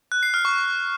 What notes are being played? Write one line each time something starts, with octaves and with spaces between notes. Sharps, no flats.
F#6
C7
F6
C#6